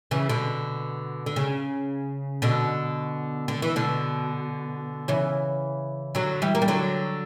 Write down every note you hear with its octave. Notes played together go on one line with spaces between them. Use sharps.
C#3 E3
B2 D3
D3
C#3
B2 D3
D3
E3
B2 D3
C#3 E3
D3 F#3
E3 G3
A#3
G3
D3 F#3